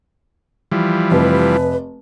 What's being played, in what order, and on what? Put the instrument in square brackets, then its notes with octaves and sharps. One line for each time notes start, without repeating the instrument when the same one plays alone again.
[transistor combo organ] E3 F3 G3
[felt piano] F1 [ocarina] B4